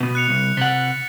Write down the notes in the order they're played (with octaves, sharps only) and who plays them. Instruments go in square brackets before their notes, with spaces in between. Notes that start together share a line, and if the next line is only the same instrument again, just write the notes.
[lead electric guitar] B2 B3
[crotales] F#6 C#7 F7
[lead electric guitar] C2
[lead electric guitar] C3 F#5 [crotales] A6 B6 G7